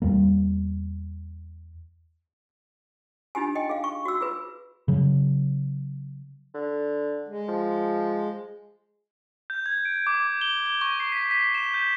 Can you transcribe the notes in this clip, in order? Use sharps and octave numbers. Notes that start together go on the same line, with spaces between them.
E2 G3 A#3
D4 D#4 F4 G4 G#5
D#5 G5 G#5
G#4 F5
C#6
F#4 E6
F4 G#4 B4
C#3 F#3
D3
G#3
F3
G6
G#6
D7
D6
G7
G7
C#6
C7
B6
B6
E7
G6